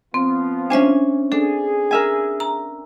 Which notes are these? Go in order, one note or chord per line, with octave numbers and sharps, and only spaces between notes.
F3 B3 C4 F4
C#4 D4 C5 E5 G#5
D4 G#4 A4
A#4 E5 G#5
A#5